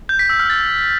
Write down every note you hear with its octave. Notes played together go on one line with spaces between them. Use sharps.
G6
B6
E6
F6
A6